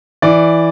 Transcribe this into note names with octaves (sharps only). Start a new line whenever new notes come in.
E3 D5